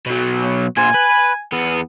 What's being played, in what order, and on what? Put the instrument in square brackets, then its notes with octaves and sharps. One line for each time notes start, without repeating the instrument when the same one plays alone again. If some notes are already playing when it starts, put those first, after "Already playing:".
[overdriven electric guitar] B2 F#3
[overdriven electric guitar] A#2 C5 [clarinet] G#5
[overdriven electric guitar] B4
E2 B3